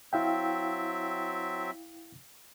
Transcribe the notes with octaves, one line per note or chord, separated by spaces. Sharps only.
F#3 C4 E4 E5 F5 G5